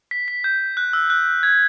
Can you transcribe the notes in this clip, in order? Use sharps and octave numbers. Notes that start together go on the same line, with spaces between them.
B6
B6
G6
F#6
E6
F#6
G#6